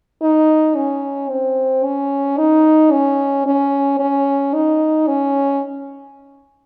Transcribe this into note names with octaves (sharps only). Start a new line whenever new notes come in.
D#4
C#4
C4
C#4
D#4
C#4
C#4
C#4
D#4
C#4